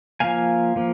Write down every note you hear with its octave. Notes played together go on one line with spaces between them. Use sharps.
F3 A#3 F5 G#5
F3 A#3